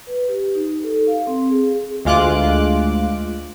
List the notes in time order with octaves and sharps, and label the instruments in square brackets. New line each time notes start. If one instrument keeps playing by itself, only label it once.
[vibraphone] B4
G4
D#4
A4
F5
C4
G#4
[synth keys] D2 G#3 F4 D6 F#6